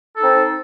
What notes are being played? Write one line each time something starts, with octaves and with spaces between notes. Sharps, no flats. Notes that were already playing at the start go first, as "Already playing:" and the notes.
C4 D#4 A4